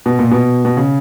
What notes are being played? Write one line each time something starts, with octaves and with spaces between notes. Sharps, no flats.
B2
A#2
B2
B2
C#3